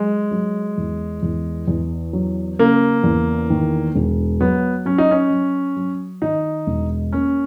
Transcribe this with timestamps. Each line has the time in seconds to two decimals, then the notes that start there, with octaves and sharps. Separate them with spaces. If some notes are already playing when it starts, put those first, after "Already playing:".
Already playing: F#3 G#3
0.31 F#3
0.78 E2
1.23 E2
1.68 E2
2.13 F#3
2.59 C#3 A#3
3.04 E2
3.50 D#3
3.95 E1
4.40 F#3 B3
4.85 F#3 C#4
4.98 D#4
5.11 C#4
5.31 F#3
5.77 F#3
6.22 D#3 D#4
6.67 E1
7.12 A#3 C#4